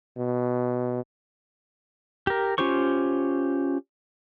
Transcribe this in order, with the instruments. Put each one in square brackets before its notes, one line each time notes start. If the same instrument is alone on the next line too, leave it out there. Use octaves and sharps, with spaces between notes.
[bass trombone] B2
[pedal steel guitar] G4 A#4
C#4 F4 G4 C5 C#6